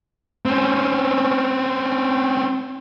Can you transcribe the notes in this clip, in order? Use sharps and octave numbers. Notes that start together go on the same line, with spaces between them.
C4 C#4